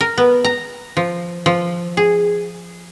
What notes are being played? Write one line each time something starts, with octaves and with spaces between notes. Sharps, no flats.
A#4
B3
A#5
F3
F3
G#4